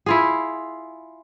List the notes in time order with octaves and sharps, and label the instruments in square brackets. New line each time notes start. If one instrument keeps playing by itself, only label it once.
[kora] E4 F4 G#4